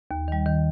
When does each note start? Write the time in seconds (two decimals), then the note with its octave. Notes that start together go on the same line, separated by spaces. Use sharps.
0.11 D#2
0.28 D#3 G3
0.46 D#3